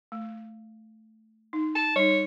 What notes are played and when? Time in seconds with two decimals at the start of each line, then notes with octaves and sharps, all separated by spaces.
0.12 A3
1.53 D#4
1.75 A5
1.96 G3 D#4 C#5